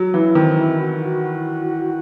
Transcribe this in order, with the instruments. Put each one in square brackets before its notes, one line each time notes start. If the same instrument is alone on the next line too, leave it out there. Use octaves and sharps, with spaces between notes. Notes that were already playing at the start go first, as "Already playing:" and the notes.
Already playing: [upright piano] F#3
[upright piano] E3 [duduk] E4
[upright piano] D#3 [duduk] C4
[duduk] E4
F#4
F#4